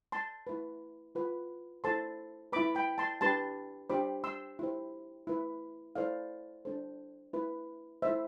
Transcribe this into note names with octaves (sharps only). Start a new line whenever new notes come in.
A5 C6
E4 B4
F4 B4
E4 A4 C5 A5 C6
E4 B4 B5 D6
G5 B5
A5 C6
D4 G4 B4 A5 C6
D4 G4 C5 B5 D6
C6 E6
E4 G4 C5
E4 B4
E4 A4 C5 D5 F5
D4 A4 C5
E4 B4
E4 A4 C5 E5